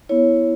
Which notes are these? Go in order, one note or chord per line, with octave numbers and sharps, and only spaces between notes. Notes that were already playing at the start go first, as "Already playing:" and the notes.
B3 E4 C#5